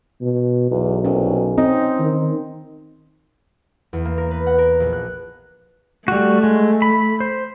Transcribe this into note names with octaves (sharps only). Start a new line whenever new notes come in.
B2
B1 E2
C2 C#4
C4 D#4
D#3
E2
A#3
A#4
B4
F#5
A#4
A#1
F#6
G3 A3 F#4
G#3
B5
C5